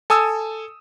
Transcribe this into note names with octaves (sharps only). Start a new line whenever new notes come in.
A4 G#5 D#6 E6